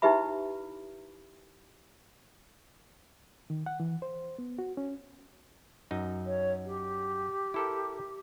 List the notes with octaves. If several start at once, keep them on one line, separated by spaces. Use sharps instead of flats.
D#4 E4 G4 B4 E5 B5
D#3
F#5
E3
C5
B3
F#4
C#4
F#2 D#4
C#5
G4
E4 A4 A#4